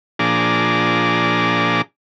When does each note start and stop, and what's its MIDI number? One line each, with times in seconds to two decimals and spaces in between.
0.19 1.82 46
0.19 1.82 53
0.19 1.82 62
0.19 1.82 68
0.19 1.82 82
0.19 1.82 86